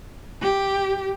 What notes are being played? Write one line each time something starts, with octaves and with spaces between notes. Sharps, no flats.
G4